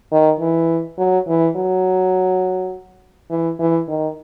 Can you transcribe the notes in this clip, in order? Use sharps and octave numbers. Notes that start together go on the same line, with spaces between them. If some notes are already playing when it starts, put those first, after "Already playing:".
D#3
E3
F#3
E3
F#3
E3
E3
D#3